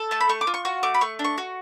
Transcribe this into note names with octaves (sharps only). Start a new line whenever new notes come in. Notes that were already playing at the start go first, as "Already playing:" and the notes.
Already playing: A4
A3 A5
B5
A3 C#6
D6
F4
C#6
F#4 C#6
A3 D6
B5
A3 C#6
D4
C#6
F#4